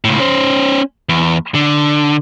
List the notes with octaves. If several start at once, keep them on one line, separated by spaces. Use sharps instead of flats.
C#2 A2
C#4 C5
E2
D3